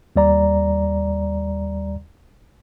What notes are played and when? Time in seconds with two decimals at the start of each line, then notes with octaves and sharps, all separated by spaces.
0.16 D#2 G3 D5 A#5